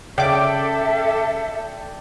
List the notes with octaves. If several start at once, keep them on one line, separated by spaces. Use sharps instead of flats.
C#3 A4 D5 E5 G5 D6